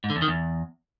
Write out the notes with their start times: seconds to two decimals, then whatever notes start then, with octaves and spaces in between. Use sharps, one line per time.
0.04 G#2
0.10 D3
0.16 E2
0.22 D#3
0.28 E2